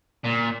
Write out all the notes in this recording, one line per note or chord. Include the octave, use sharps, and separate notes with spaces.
A#2